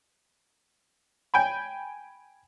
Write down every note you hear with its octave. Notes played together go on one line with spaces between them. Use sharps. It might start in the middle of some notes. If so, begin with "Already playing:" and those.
G5 G#5 B5